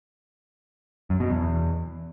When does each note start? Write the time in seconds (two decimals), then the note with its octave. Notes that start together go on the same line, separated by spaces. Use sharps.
1.10 F#2
1.20 B2
1.30 E2